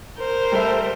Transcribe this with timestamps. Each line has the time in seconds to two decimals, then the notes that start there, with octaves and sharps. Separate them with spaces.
0.19 A#4 C5
0.52 G3 A4 E5